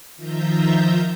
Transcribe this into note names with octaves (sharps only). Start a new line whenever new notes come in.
D#3 F3 F4 E5 A#5 G6